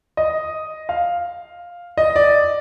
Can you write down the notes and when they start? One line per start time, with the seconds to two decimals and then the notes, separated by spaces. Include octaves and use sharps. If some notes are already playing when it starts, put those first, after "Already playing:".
0.17 D#5
0.89 F5
1.98 D#5
2.16 D5